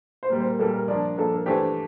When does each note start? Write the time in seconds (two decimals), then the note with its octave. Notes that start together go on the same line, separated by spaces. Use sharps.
0.23 C5
0.30 A#2 G3 A#3 A#4
0.40 C5
0.44 A#4
0.59 A#2 G3 A#3 A4
0.73 A#4
0.88 F3 A#3 D4 D5
1.17 F3 A#3 D4 A4
1.32 A#4
1.46 E3 A3 D4 G4 C5